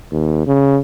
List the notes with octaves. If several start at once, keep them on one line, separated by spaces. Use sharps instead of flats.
D#2
C#3